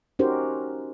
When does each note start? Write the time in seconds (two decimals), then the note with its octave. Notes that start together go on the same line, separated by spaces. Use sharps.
0.19 C#4 D#4 F#4 G4 A#4 C5